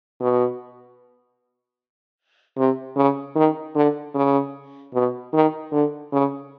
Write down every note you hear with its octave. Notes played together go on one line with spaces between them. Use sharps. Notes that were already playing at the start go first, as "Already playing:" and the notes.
B2
C3
C#3
D#3
D3
C#3
B2
D#3
D3
C#3